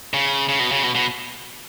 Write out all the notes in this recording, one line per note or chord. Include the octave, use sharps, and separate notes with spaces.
C#3
C#3
B2
C#3
B2
B2